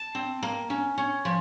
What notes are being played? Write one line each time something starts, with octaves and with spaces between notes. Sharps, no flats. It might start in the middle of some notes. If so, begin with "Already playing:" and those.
Already playing: A5
C4
A#3
C#4
C#4
F3